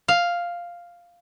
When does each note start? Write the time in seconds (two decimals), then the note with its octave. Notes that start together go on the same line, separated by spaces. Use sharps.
0.08 F5